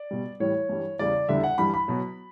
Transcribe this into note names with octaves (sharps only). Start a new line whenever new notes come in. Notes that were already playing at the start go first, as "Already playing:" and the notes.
Already playing: D5
B2 G3
A2 E3 G3 C#5
G2 E3 G3
E2 C#3 G3 D5
E2 D3 G3 E5
F#5
G2 E3 G3 B5
B5
B2 F#3